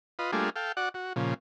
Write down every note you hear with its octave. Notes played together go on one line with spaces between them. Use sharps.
F4 B4 D#5
G3 A3 A#3 D4 F4 G#4
A4 F5 G5
F#4 D5 F#5
F#4
A#2 C#3 F3